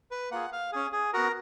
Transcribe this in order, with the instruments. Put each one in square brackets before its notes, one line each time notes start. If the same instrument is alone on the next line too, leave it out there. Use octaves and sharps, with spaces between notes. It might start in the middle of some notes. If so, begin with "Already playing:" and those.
[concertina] B4
A#3 F4 G#4 F#5
F5
C#4 G#4
G#4
B3 F#4 A#4